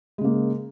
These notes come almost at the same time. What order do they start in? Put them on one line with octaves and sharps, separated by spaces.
G#3 C#3 A#3